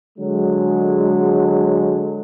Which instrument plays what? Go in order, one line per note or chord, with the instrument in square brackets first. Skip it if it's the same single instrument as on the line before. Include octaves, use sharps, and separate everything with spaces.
[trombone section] D3 F#3 G#3